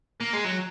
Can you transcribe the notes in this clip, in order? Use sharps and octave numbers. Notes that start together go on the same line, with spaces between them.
A#3
G#3
F#3